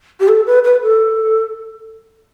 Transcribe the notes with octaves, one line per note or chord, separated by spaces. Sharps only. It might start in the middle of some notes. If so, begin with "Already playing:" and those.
G4
A4
B4
B4
A4